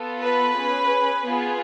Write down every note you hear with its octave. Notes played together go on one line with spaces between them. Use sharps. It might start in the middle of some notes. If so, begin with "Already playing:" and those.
Already playing: B3 F4 A4
B4
C#4 G#4
B3 F4 G#4